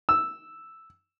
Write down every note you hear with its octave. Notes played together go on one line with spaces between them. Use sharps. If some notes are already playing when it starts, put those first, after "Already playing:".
E6